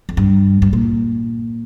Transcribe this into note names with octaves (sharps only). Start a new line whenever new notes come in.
F2
G2
G2
A#2